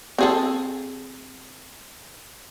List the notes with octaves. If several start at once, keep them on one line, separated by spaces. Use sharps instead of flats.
C4 G#4 A4